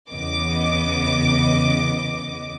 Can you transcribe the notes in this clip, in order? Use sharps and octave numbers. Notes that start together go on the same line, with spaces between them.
E2 C#3 B3 D#5 D6